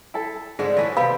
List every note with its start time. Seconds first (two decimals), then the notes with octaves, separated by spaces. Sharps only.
0.14 E4 A4
0.59 G#2 D3 G3 G#3 C4
0.77 A2 E3 A3 C#4 D#4 F#4
0.97 C3 C4 B4 F5 B5